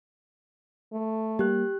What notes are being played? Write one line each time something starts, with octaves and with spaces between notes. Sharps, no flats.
A3
G3 A#3 G4 F#6